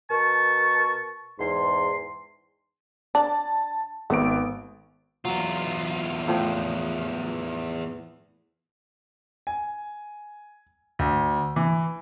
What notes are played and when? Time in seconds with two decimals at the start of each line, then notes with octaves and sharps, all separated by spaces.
0.10 B2 A#4 A5 C#6
1.39 E2 G#2 C6
3.15 D4 A5
4.10 G#1 A3 B3 D7
5.25 E2 F#3 F4
6.28 A2 F3 C5
9.47 G#5
10.99 D2
11.56 E3